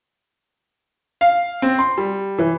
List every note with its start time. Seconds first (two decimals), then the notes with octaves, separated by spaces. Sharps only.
1.21 F5
1.62 C4
1.79 C6
1.98 G3
2.39 E3